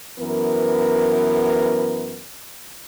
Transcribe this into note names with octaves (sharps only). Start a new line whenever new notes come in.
F#2 E3 B3 A#4